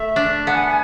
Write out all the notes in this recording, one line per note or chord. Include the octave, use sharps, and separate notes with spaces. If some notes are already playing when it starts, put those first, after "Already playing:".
Already playing: A3 E5
D4
B3 A5
G#5
F#5
G#5